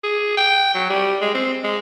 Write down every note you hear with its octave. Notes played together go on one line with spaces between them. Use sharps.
G#4
G5
F#3
G3
G#3
C4
G#3